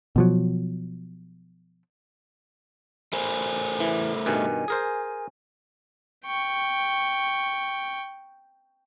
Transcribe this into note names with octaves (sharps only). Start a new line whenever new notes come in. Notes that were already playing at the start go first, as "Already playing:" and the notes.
B2 F3 F#3
A3 A#4 C5 G#5
E3
G2 B2 D#3 G#5
G#4 A#4 C5
G5 C#6